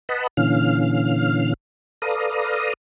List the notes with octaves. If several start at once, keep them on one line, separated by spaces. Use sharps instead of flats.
B4 D#5 F#5 A5 B5
A#2 D3 E3 C#4 F5 F6
A4 B4 D5 F5 A#5 D#6